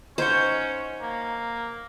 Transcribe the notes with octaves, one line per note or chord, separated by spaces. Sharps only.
C#4 D#4 C5 C#5 F#5
A#3